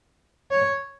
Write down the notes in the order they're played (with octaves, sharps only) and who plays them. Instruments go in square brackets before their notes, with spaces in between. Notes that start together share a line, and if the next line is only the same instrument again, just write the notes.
[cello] C#5